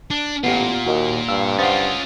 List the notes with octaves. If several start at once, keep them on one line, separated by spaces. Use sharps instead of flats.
D4
A1 A#2 B3 F4 G4 F#5
D#2 F#4 A#4 D#5
G2 F5 E6
C#4 F4 C5 F5 F#5 D#6 A6